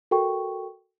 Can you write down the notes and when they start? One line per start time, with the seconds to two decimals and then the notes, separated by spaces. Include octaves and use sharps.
0.11 F#4 A4 A#4 G5 C#6